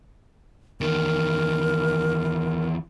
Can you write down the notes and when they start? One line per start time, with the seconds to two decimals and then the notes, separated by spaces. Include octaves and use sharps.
0.81 E2 D#3 A#4